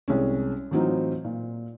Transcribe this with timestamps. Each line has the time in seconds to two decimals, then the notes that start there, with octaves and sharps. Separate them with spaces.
0.08 C2 G#3 C#4
0.71 A2 E3 F#3 C4 D#4 F4
1.25 A#2